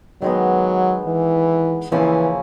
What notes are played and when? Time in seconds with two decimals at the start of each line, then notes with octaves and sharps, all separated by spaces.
0.22 D#3 F#3 G#3 B3
1.07 E3
1.92 C#3 E3 F3 A#3 C#4 E4